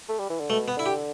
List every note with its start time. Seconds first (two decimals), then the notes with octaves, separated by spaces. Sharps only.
0.09 A3
0.19 G3
0.30 E3
0.40 D3
0.50 B2 A3
0.68 B3
0.77 D3 E4
0.86 G4